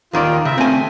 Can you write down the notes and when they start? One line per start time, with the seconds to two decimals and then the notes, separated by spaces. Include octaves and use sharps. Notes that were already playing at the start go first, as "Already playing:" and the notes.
0.13 D#2 D#3 F4 D5
0.45 C#3 E5
0.58 A3 C4 G#5